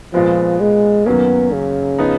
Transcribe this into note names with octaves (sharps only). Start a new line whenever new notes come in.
A#2 F3 G#3 B3
G#3
F#2 D#3 F#3 A#3 B3 C#4
C#3
F3 B3 D#4